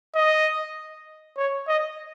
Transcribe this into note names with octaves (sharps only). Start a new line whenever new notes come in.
D#5
C#5
D#5